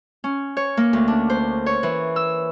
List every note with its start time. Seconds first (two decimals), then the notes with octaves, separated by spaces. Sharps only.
0.24 C#4
0.57 C#5
0.77 A#3
0.93 D2
1.08 D4
1.30 C5
1.66 C#5
1.83 E3
2.16 E6